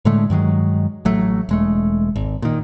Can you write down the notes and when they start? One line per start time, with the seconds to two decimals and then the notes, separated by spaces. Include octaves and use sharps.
0.05 A2 D3 G#3 A3
0.30 G2 D#3 F#3 G#3
1.05 A1 F#3 A3
1.49 E1 G#3 A3
2.16 G#1
2.42 A#2 D#3